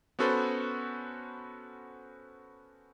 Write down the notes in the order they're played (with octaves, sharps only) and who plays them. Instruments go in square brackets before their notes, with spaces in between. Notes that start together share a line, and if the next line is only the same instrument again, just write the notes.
[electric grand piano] B3 C#4 F#4 A4 B4 C5